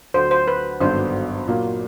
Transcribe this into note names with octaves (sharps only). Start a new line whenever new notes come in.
D2 D3 F#3 C5
C5
B4
G#1 G2 D3 F#3 B3 C5
A#2 F#3 A#3